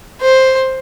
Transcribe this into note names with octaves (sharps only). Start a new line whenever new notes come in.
C5